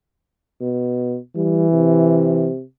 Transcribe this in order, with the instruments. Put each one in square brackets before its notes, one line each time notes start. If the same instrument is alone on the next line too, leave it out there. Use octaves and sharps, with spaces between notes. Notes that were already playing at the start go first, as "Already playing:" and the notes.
[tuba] B2
[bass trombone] E3 [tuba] G3
[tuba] C3